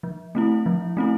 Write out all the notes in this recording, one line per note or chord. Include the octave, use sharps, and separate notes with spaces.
F3
A3 C4 E4
F3
A3 C4 E4